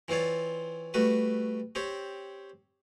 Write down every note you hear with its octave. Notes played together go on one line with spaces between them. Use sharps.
E3 C4 F4 C#5 D5
G3 A3 F#4 B4
C4 G4 C#5